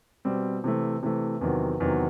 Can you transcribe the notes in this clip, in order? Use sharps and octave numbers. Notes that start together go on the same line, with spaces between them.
B2 G3 C4
C3 E3 A3
C3 E3 A3
E2 C3 D#3 F#3
E2 C3 D#3 F#3